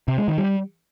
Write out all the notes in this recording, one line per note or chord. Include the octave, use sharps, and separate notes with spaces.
C3
G#3
D#3
G3